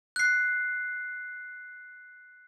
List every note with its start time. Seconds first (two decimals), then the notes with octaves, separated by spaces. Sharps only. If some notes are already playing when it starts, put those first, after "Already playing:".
0.16 F#6 C7